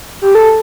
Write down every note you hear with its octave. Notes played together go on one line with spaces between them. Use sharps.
G4
A4